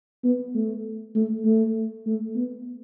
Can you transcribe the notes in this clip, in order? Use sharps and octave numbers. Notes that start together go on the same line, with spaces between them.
B3
A3
A3
A3
A3
B3